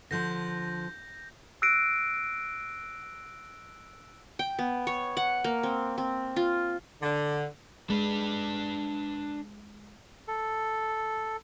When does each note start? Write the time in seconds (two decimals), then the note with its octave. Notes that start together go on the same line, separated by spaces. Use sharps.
0.11 D3 F3 G6 A#6
1.62 E6 F#6 A#6 C7 D7 D#7
4.39 G5
4.59 B3
4.87 C#5
5.17 F#5
5.44 A#3
5.63 C4
5.98 C4
6.36 F4
7.01 D3
7.90 G#3 D4 B4
10.28 A4